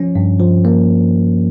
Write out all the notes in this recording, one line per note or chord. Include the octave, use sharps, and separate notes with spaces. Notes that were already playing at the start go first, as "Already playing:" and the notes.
Already playing: F3 C#4
G2
F3
A#3